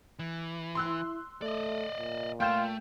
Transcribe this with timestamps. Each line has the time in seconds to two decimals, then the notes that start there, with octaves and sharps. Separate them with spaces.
0.19 E3
0.75 E4 C6 E6 F#6
1.42 A3 D5 D#5
1.98 A#2
2.40 A3 F4 G5 G6 E7